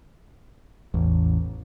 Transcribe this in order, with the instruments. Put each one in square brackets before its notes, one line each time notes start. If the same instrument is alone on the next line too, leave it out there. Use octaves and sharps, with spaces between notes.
[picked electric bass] A1 [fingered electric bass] E2